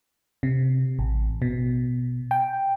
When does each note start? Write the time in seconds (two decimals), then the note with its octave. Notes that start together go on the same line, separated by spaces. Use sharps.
0.43 C3
0.99 A1
1.42 B2
2.31 G5